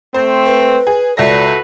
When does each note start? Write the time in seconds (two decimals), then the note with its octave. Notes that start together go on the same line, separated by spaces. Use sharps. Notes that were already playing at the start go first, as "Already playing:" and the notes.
0.14 A3 C4 C5
0.46 B4
0.87 G#4
1.17 C#2 F#4 A4 B4 D5 E5 A#6